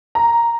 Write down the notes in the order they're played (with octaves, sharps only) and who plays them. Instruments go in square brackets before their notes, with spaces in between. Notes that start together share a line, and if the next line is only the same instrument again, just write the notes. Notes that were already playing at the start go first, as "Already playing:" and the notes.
[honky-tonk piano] A#5